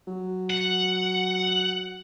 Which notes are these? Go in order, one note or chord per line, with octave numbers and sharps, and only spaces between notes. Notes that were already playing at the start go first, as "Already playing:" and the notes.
F#3
F#5